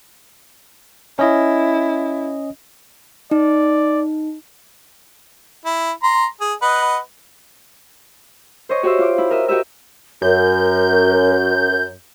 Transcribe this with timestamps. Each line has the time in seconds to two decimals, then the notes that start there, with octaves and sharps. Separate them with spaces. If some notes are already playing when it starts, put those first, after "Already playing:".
1.19 C#4 E4 D#5
3.31 D#4 D5
5.65 E4
6.03 A#5 C6
6.41 G#4
6.62 B4 D#5 F#5
8.69 C5 C#5 D#5 C#6
8.83 F#4 G4 C5 E5
8.98 F4 D6
9.18 E4
9.31 A#4 D#5 E5
9.48 F#4 G4 D#5 E5
10.22 F#2 A#4 G6